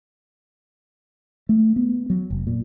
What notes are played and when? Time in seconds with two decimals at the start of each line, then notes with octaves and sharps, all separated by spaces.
1.49 A3
1.76 B3
2.10 F#3
2.30 F1
2.47 A#2